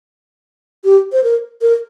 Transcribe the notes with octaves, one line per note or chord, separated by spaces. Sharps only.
G4
C5
A#4
A#4